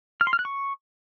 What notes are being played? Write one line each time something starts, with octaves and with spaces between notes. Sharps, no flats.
F6
C6
F6
F#6
C#6